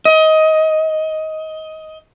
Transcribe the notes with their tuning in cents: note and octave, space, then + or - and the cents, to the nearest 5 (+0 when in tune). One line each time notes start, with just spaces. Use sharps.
D#5 +20